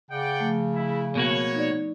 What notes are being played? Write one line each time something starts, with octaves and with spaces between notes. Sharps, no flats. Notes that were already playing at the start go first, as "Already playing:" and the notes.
C#3 D5 F#5 G5
F3 A3
E4
B2 A#3 F#4 C#5
D#4 D5